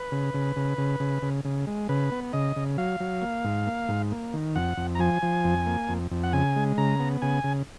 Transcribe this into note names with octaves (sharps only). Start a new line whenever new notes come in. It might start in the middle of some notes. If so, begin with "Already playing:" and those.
Already playing: B4
C#3
C#3
C#3
C#3
C#3
C#3
C#3
G#3
C#3 B4
B3
C#3 D#5
C#3
F#3 F5
F#3
A#3
G#2
A#3
G#2
A#3
D#3
F2 F#5
F2
A#5
F3 G#5
F3
F2
A#3
F2
F2
F#5
C#3 G#5
G#3
C#3 A#5
B3
C#3 G#5
C#3